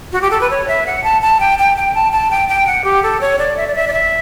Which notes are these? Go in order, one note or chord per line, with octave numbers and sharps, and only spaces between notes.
F#4
G4
A4
B4
C#5
E5
F#5
A5
A5
G5
G5
G5
A5
A5
G5
G5
F#5
G4
A4
C#5
D5
E5
D5
E5
D5
E5